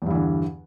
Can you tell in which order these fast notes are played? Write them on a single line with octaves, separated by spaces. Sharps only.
E2 G2 E3 D3